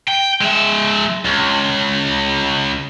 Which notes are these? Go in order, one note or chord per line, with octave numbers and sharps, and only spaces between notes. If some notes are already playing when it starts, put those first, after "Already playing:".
G5
G#3 E5
C#2